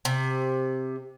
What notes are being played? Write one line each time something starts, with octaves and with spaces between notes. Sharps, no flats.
C3